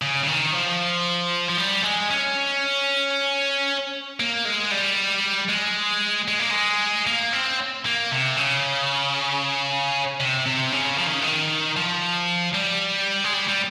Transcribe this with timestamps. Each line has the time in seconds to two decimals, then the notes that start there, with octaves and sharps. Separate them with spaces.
0.02 C#3
0.24 C#3
0.27 D#3
0.53 F3
1.50 F3
1.58 G3
1.84 G#3
2.11 C#4
4.20 A#3
4.45 G#3
4.71 G3
5.49 G#3
6.28 G#3
6.40 A#3
6.51 G#3
7.07 A#3
7.33 C4
7.85 A#3
8.12 C3
8.37 C#3
10.20 C3
10.46 C3
10.72 C#3
10.98 F3
11.07 D#3
11.14 C#3
11.22 D#3
11.77 F3
12.55 G3
13.24 G#3
13.34 G3
13.48 G3